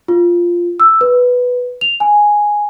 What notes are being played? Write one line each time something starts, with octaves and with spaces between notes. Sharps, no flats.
F4
E6
B4
F7
G#5